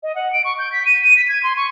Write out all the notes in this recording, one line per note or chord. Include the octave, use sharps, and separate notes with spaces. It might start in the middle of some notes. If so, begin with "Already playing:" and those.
D#5
F#5
D7
C#6
G6
B6
D#7
D#7
B6
G#6
C6
C#6